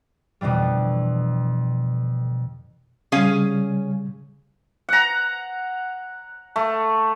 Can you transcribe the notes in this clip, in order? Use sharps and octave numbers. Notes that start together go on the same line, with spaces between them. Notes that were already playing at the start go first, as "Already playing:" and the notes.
F2 B2 D3 E3 G3
C#3 G3 C#4 G#4 F5
F#5 A#5
A3